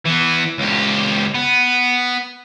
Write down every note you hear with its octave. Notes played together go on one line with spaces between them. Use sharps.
E3 B3
C#2 G4
B3